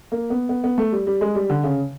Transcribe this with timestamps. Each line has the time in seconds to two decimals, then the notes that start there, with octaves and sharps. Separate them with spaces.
0.12 A#3
0.30 B3
0.49 B3
0.64 B3
0.78 A3
0.92 G3
1.07 G3
1.21 G#3
1.35 G3
1.50 D3
1.64 C#3